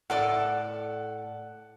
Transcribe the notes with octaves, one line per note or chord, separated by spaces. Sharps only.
A2 A4 D5 F#5